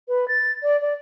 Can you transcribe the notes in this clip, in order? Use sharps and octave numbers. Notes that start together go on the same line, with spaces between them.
B4
A6
D5
D5